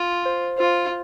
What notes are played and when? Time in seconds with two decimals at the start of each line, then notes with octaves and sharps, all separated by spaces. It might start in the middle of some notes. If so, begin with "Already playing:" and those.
Already playing: F4
0.25 C5
0.58 F4 C5